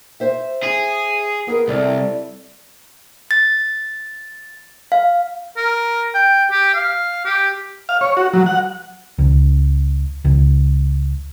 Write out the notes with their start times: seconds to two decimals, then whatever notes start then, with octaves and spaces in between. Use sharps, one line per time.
0.20 C5 E5
0.63 G#4
1.47 B3 G#4 A#4
1.68 C2 E4 A4 D5
3.31 A6
4.92 F5
5.57 A#4
6.14 G5
6.51 G4
6.74 F5
7.25 G4
7.89 F5
8.01 C#5
8.17 F#4
8.33 F#3
8.46 F#5
9.18 C#2
10.25 C#2